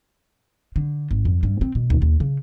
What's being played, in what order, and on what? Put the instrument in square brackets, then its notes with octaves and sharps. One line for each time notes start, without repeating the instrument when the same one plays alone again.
[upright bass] D3
G#1
F2
G2
C4
B2
D#2
D#2
C#3